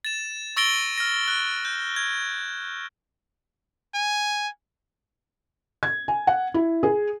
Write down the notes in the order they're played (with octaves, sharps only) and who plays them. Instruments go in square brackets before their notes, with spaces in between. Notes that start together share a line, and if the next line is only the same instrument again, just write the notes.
[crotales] A6 E7
C#6 E6 A6 A#6 D7 G7
F6 A#6
F#6
G6
G#6
[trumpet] G#5
[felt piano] G#6
G#5
F#5
E4
G#4